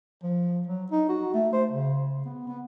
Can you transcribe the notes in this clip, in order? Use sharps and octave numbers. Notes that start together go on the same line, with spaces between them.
F3
F#3
D#4
F#4
A3
C5
C#3
B3
B3